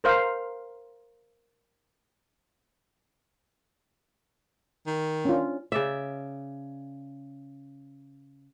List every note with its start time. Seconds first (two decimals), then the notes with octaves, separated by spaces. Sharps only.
0.04 A#4 C5 F5
4.86 D#3
5.25 C#4 D4 F4
5.72 C#3 D5 E5